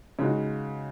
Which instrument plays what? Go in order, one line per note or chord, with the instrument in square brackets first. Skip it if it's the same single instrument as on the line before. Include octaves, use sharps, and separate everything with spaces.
[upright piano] C#3 G#3 D#4 F#4